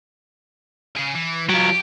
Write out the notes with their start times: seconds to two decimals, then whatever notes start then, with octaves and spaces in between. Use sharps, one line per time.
0.96 C#3 G#4
1.15 E3
1.49 F#3 F4 G4